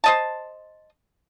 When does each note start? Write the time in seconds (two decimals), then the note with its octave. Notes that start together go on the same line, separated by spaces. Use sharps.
0.04 C5 D#5 A5